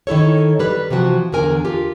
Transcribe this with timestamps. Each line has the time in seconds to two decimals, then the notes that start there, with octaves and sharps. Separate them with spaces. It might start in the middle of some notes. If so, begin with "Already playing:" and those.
0.07 D#3 E4 A4 C#5
0.59 G3 B4
0.90 C3 E3 F3 F#4
1.32 E2 D3 A#4 G#5
1.65 F4 G4